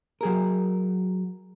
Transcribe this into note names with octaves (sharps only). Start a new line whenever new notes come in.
F#3 G#4 A#4